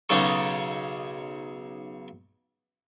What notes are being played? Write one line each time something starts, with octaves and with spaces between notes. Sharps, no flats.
B1 C#3 C#4 D#4 A4 C#6